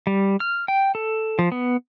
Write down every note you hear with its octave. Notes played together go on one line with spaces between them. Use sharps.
G3
F6
G5
A4
F3
B3